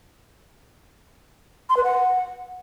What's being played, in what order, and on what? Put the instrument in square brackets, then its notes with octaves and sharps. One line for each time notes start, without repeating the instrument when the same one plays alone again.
[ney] C6
B4
F#5